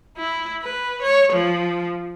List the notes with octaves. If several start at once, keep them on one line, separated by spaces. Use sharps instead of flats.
E4
B4
C#5
F3